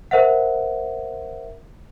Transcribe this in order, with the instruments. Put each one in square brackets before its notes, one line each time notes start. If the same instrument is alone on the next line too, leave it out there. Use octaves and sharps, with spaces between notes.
[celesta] A#4 C5 E5 F#5